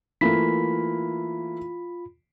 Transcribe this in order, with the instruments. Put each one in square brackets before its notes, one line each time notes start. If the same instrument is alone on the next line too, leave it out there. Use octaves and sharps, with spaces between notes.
[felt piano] E3 A3 A#3 [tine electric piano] F4 B5 B6